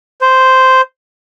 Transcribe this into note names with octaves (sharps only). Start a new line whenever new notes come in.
C5